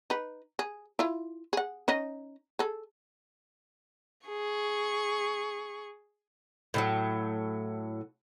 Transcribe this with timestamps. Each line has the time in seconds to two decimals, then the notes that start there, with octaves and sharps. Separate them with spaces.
0.10 D#4 B4
0.59 G#4
0.99 E4 F4
1.53 G#4 F#5
1.88 C#4 D#4 D#5
2.59 G#4 A4
4.27 G#4 C#6
6.74 A2 D#3 F#3